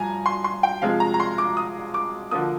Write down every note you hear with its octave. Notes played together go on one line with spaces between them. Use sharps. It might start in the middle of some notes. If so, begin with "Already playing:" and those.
Already playing: G2 F3 G#5 A#5
C6
C6
G5
C3 F3 G#3 F5
A#5
A#5
C6
D6
D#6
D6
D3 F3 A#3 D#6